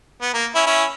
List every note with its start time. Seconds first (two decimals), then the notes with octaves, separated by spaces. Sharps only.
0.22 B3
0.34 A#3
0.55 C#4 E4
0.66 C#4 E4